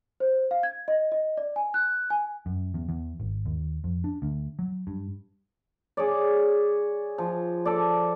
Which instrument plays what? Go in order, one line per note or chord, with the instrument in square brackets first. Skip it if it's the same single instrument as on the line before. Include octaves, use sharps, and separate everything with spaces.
[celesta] C5
F5
G#6
D#5
D#5
D5
G#5
F#6
G#5
[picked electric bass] F#2
E2
E2
G#1
D#2
F2
D4
D2
F#3
G2
[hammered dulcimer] G#4 C#5 D5
F3
A4 D5